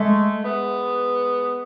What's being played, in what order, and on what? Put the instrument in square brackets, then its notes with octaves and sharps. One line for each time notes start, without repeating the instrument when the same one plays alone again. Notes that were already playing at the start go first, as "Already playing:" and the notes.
Already playing: [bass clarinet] G#3 [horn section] A3
[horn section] G#3 B3